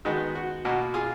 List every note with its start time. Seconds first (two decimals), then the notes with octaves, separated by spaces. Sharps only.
0.05 D#3 G#3 B3 F#4
0.35 F#4
0.65 B2 A#3 F#4
0.94 F4 G#4